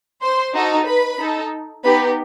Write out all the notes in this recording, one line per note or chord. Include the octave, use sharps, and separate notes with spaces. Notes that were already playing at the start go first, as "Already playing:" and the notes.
C5 C6
D#4 F#4 A4
B4 B5
D#4 A4
B3 D#4 G4 B4 B5